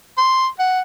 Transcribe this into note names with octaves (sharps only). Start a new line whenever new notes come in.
C6
F#5